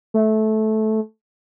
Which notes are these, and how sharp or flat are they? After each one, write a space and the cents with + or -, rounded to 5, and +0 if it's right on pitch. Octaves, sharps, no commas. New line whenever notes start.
A3 -15